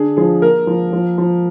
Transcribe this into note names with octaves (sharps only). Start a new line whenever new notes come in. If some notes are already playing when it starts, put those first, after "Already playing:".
Already playing: D3 D4 G#4
F3 G#4
A#3 A#4
F3
F3
F3